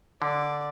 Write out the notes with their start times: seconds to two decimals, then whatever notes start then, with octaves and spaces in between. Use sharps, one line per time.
0.21 D3 D5